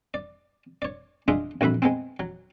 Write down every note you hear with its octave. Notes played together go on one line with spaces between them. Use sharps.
D5
C#5 D5
G#3 D4 F4 G#4 E5
A#1 F2 F#4 E5 B5
G#3 B3 C4
F#3